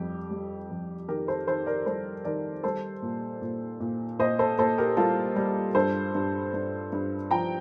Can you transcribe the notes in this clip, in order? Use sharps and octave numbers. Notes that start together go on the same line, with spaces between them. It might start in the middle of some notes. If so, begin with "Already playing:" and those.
Already playing: F2 G3 G4
G3
F2
D#3 G4 A#4
A4 C5
D#3 A4 C5
A#4 D5
G3 A4 C5
D#3 A#4 D5
G3 A4 C5
A#2
A#2
A#2
A#2 C5 D#5
A4 C5
A#2 A4 C5
G4 A#4
G3 F4 A4
G3
G2 A4 C5
G2
G2
G2
F3 G5 A#5